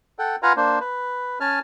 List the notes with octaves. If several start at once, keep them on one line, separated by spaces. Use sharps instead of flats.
A4 F#5 G5
F4 B4 F5 F#5 G#5 A#5
A#3 D4 C5
B4
C#4 G#5 A5 F6